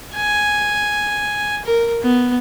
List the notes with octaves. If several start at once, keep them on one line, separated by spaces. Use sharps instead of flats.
G#5
A#4
B3